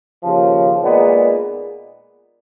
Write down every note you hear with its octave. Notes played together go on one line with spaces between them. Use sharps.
D#2 C#3 F3
A#2 G#3 B3 D#4